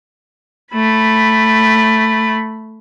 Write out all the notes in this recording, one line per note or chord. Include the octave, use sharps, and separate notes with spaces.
A3 B5